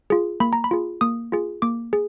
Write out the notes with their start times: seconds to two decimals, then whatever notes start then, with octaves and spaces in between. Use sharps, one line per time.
0.10 F4 G#4
0.40 A#3 B5
0.53 A#5
0.64 B5
0.71 F4 G#4
1.01 A#3 D#6
1.32 F4 G#4
1.62 A#3 D6
1.93 G#4